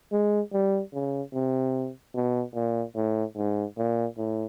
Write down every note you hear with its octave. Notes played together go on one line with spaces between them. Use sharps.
G#3
G3
C#3
C3
B2
A#2
A2
G#2
A#2
A2